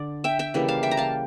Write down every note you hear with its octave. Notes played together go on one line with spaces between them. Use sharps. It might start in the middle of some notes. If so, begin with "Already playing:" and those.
Already playing: D3 D5
E5 G5
E5 G5
C#3 E3 G3 A#3
F5 A5
E5 G5
A#5
F5 A5